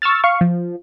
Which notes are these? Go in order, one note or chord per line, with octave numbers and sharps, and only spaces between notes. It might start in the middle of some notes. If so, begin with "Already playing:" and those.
C#6 E6 F6 A6
F5 C#6
F3